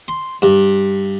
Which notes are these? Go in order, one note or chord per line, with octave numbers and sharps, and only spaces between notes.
C6
G2